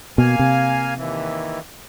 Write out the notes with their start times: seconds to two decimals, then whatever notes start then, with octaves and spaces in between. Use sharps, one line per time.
0.18 B2 A#3 F5 G#5
0.39 C3
0.97 D#2 E3